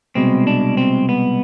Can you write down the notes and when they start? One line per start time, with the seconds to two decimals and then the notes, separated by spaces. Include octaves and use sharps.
0.15 C2 B2 G#3 C4
0.47 D4
0.77 C4
1.09 B3